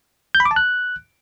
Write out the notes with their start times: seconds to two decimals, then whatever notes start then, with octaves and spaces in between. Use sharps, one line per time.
0.35 G6
0.40 B5
0.45 D6
0.51 A5
0.56 F#6